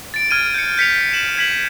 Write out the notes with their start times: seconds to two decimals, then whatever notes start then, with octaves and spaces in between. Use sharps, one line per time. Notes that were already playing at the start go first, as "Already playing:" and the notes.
0.14 A6 D7
0.31 F6 G#6 D#7
0.54 G6 C#7
0.77 G6 B6 C#7 F7
1.13 E7 F#7
1.37 G#6 B6 F#7